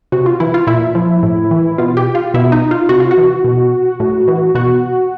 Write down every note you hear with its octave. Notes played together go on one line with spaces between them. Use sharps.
C3 F#4
F4
E3 E4
F4
A#2 E4
F3
A2
E3
B2 F4
G4
F4
B2 E4
D#4
F4
C3 F#4
F4
F#4
E3
B2
A2
E3
B2 F#4